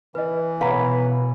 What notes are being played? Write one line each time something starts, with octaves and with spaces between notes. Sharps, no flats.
E3 B4 D#5
B2 B4 C#5 F5 F#5 A#5